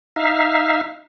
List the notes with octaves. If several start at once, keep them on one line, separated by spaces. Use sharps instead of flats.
D#4 E5 F5